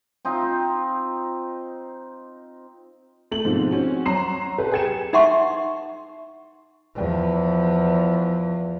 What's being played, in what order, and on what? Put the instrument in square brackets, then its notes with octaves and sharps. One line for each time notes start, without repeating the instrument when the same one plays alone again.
[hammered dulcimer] C4 D#4 F4
[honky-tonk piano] A3 F#7
G#2 B2 D#3 F3 C4
C4 C#4 F#4
F#3 C#5 A#5 C6 C7 E7
G4 A4 B4
G#4 B4 G5 G#6 C#7 E7
[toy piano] D#4 E5 F#5 C6 C#6
[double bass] E2 F3